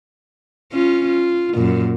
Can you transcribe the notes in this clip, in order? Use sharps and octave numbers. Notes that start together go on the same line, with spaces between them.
C#4 F4
F4
F#2 A#2